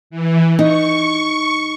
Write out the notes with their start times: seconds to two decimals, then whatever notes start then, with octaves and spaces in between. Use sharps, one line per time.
0.10 E3
0.59 D#4 C#6